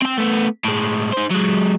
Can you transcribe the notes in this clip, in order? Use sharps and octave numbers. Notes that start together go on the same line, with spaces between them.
C4 G5
A3 B3
A2 G#3
D#4 C5
F#3 G#3